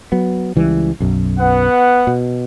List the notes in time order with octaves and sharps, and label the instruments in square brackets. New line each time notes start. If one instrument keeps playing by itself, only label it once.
[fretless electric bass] F#3 B3
C#2 E3 G3
B1 F#2
[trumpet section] B3 F#5
[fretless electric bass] B2